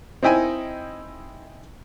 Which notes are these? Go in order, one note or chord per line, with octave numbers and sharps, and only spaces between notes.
C4 D#4 E4 G5 G#5